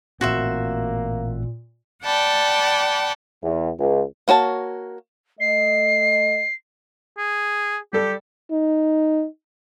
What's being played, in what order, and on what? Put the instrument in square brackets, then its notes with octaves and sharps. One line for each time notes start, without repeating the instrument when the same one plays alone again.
[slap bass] A1 C4 [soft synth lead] A#2 [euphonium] A#3 [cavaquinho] F#4 C5 E5
[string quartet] D5 F#5 G5 A5 B5
[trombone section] E2
C#2
[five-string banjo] A#3 F#4 C#5 A5
[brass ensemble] A3 D#5 [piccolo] C7
[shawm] G#4
[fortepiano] G3 A4 [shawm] G4
[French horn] D#4